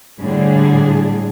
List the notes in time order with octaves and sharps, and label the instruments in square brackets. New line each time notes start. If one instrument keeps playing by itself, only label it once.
[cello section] A2 D3 G3 D4 G#4